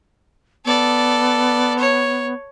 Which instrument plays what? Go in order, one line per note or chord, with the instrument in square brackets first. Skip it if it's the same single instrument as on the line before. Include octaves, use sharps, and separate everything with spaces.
[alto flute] B3 [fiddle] A4 D5
[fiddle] C#5